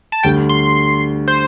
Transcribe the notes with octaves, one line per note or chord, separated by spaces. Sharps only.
A5
D2 D3 G3 G5
C6
C5